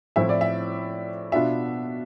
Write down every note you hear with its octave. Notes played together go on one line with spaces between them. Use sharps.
A2 F3 C4 E4 E5
D5
E5
B2 B3 D4 F4 E5